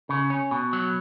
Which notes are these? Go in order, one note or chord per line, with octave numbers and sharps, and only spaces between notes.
C#3
C#4
B2
F#3